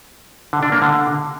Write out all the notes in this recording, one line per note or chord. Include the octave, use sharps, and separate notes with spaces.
D3
D4
A#3
D3